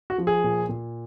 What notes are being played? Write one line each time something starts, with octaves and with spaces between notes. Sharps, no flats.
F#4
F3
G#4
A#2
A#2